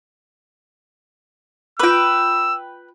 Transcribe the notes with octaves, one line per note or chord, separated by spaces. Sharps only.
F4 B4 G5 D6 E6